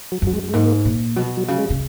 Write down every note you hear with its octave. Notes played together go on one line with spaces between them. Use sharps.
F#3
F#2
F#3
G#3
G#3
G#2 A#3
A#2
B2 F#3
F#3
C#3 F#3
G#3
C#3